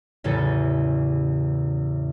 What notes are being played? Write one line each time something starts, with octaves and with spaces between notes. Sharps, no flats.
A1 E2 C#3 A4